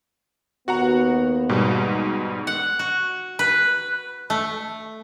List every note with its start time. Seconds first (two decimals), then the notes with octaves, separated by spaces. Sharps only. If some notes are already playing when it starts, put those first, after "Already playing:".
0.68 D#2 B3 F#4 F#5 A#5
1.49 G#2 B2 G3
2.47 F#5
2.79 F#4
3.39 B4
4.30 A3